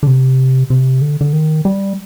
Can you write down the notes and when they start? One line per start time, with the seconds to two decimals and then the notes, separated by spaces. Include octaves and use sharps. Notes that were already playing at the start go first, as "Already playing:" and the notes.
0.03 D3
0.07 C3
0.70 C3
1.01 D3
1.21 D3
1.33 D#3
1.65 G3